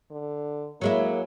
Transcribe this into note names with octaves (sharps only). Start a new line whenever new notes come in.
D3
F#3 G#3 A#3 E4